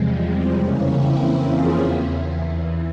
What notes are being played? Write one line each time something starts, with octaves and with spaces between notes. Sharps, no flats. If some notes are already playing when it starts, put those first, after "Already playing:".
Already playing: E2 C3 F3 G3 G#3
G#3 C4
F2 C#3 E3 A#3 C#4
C4 E4
F4 G#4
E2 E3